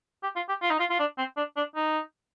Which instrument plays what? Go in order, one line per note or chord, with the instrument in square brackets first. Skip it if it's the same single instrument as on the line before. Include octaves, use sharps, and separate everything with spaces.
[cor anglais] G4
F4
G4
F4
D#4
F4
F4
D4
C4
D4
D4
D#4